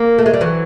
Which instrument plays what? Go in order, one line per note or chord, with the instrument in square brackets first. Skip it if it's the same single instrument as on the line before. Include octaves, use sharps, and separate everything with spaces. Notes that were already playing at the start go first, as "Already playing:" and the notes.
Already playing: [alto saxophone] A#3
[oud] A3
G#3
G3
E3 F#3